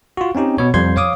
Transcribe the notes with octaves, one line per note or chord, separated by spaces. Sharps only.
F4 F#4
C4 C#4 D#4 G4
B2 C#5
F2 F3 G3 C5 C6 G#6
C#5 F5 D6 D#6